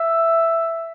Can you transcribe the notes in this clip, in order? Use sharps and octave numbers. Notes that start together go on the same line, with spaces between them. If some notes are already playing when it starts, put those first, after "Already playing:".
Already playing: E5